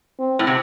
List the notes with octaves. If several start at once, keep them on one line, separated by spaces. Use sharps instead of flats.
C4
A2
C3